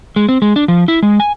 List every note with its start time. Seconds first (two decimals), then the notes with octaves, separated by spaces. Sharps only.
0.16 G#3
0.29 C4
0.42 G#3
0.56 D4
0.68 F3
0.88 E4
1.03 G#3
1.20 G#5